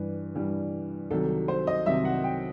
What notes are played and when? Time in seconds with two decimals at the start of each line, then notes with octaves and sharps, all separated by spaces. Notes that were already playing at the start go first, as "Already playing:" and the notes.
Already playing: G2 E3 G3 B4
0.35 G2 E3 G3
1.11 C2 C3 D#3 F#3 A4
1.48 C5
1.67 D#5
1.86 C2 C3 D#3 F#3 E5
2.05 F#5
2.24 G5